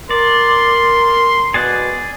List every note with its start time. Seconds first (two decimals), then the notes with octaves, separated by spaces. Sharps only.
0.10 A#4 D5 C6
1.54 B2 G#4 D5 F#6